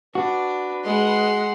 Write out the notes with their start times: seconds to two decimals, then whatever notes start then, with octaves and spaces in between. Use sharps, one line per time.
0.15 D4 F#4 B4
0.85 G#3 F#5 C6